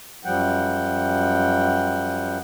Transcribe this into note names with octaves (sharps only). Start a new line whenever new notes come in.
F#2 F3 G3 F#5 G5